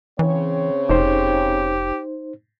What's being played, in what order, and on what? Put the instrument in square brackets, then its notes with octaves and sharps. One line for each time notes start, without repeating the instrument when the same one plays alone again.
[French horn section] C#3 C4 C#5 [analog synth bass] E3
[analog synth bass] F1 [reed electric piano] D#4 C5 [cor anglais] G4